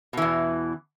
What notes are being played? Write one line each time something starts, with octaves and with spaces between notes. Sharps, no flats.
E2 B2 E3